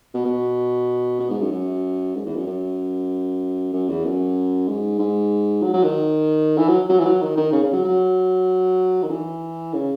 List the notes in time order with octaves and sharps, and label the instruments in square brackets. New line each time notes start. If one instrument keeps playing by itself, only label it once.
[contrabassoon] B2
B2
B2
G#2
F#2
F#2
G#2
E2
F#2
F#2
F#2
E2
F#2
G#2
G#2
F#3
F#3
D#3
E3
F#3
F#3
E3
F#3
D#3
D#3
C#3
C#3
F#3
F#3
D#3
E3
C#3